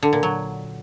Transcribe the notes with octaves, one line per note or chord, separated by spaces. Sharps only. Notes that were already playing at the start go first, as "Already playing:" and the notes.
D3
A#2
F#3